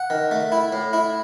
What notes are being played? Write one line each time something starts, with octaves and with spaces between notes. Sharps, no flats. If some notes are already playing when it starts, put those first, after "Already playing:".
Already playing: F#5
D#3
A3
E4
A2
E4